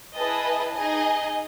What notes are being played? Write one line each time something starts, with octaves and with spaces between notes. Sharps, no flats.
E4 G#4 B4 D#5 A5
D#4 G#4 D#5 G#5